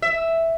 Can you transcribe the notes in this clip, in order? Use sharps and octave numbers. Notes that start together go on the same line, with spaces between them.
E5